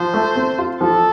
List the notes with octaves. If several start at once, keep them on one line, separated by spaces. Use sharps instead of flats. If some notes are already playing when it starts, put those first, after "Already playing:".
Already playing: F3 C5
A3
C4
F4
F3 A4